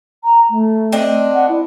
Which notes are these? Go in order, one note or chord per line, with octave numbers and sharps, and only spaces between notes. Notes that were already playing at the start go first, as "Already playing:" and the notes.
A#5
A3
C4 D4 D#5
F#5
E4